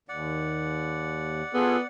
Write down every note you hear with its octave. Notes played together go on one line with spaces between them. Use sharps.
D#2 D5 F#5
B3 F4 G#4 A4